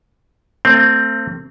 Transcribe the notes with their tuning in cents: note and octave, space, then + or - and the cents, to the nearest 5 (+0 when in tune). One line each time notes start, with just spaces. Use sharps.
A3 +40 C4 +0